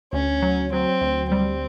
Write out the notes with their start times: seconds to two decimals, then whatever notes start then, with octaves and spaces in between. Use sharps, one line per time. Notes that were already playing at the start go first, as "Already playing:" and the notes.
0.13 D2 C#4
0.42 F#3
0.72 F#3 C4
1.01 D2
1.31 G3 C4